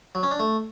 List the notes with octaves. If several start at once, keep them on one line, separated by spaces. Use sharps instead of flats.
F#3
C#4
D4
A3